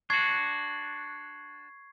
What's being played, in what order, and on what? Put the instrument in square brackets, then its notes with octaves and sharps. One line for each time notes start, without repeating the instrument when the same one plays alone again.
[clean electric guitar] D4 F#4 [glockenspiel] C#6 G#6 C7